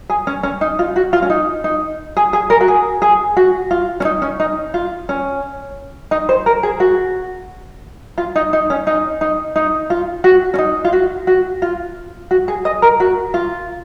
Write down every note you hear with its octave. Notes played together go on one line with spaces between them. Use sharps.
G#4
C#4
C#4
D#4
F4
F#4
F4
C#4
D#4
D#4
G#4
G#4
A#4
F#4
G#4
G#4
F#4
F4
C#4
D#4
C#4
D#4
F4
C#4
D#4
C5
A#4
G#4
F#4
F4
D#4
D#4
C#4
D#4
D#4
D#4
F4
F#4
C#4
D#4
F4
F#4
F#4
F4
F#4
G#4
D#5
A#4
F#4
F4